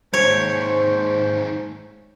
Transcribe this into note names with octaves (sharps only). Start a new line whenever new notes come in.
D#2 G#2 C5 C#5